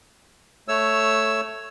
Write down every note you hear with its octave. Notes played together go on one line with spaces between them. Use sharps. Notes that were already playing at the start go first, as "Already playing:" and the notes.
A3 C#5 E6